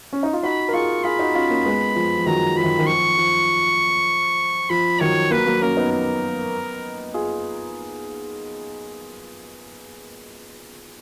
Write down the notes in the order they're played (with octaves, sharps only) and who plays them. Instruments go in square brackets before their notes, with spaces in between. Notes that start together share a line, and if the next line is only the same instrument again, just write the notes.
[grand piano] C#4
D#4
F4
[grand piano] D#4 F#4 [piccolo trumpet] B5
[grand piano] A#4
[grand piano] F4 G#4 [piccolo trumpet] C#6
[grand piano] F4 G#4 [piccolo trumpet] B5
[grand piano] D#4 F#4
C#4 F4
A#3 C#4
G#3 B3
F3 G#3
F3
[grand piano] D#3 F#3 [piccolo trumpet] A#5
[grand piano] F3 [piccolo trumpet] B5
[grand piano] D#3
D#3
[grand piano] F3 [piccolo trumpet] C#6
[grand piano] F3
[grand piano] F3 [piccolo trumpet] B5
[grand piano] D#3 F#3 [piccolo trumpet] C#5
[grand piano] F#3 A#3 [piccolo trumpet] B4
[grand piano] F#3 A#3
[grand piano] A#3 C#4 [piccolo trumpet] A#4
[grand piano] B3 D#4
[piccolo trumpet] A#4
[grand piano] F4 G#4